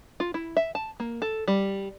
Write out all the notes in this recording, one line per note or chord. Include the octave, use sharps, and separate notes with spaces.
F4
E4
E5
A5
A#3
A4
G3